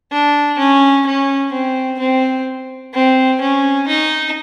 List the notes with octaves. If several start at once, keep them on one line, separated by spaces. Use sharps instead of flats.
D4
C#4
C#4
C4
C4
C4
C#4
D#4